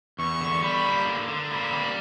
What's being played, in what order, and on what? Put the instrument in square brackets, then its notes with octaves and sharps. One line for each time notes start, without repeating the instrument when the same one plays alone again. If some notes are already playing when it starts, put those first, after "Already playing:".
[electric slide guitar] E2 [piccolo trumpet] C#6
[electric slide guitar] D3
[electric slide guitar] G3 [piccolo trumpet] B5
[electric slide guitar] A#3
D3
D3
[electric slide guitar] A#3 [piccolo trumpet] B5
[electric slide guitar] G3